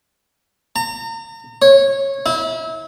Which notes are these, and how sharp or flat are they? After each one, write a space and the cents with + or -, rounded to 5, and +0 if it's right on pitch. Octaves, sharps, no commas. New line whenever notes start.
A#5 -35
C#5 -20
E4 -30